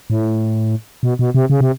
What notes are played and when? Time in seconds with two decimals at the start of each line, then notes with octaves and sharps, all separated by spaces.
0.10 A2
1.03 B2
1.19 B2
1.34 C3
1.50 C#3
1.61 C3